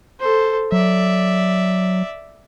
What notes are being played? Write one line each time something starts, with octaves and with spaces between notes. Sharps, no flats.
A4 C5
F#3 D5 E5